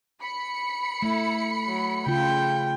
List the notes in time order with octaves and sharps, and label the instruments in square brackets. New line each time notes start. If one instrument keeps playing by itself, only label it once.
[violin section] B5 C#7
[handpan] A3 [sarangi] E4
[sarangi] F#3
[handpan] C#3 F4 [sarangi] G5